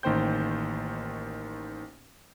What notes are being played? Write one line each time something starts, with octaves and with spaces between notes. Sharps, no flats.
A1 D#3 A#3 C5 G5 G6